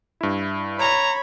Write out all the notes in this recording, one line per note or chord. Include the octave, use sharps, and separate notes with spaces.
G2 E4
C#5 A#5 B5